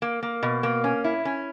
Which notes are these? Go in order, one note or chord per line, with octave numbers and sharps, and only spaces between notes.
A#3
A#3
B2
A#3
C#4
E4
C#4